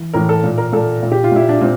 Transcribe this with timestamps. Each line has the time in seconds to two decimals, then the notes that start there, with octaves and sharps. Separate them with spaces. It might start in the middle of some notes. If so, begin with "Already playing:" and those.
Already playing: E3
0.14 A2 E3 A#4
0.29 A4
0.44 A#2
0.58 A#4
0.72 A#2 A4
1.03 A#2
1.12 G4
1.24 F4
1.32 A#2 E4
1.49 D4
1.61 A#2 C4